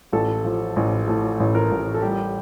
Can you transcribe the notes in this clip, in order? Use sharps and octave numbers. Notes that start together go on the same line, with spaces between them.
A1 A4
F3
A1
A2 A4
A1
A#4
A1
A4
G3 G4